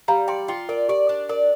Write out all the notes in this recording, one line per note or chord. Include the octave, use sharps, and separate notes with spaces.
G3 F5 A#5
D5 G5 C6
F4 G5 C6
A#4 D5
G4 D5
D4
A#4 D5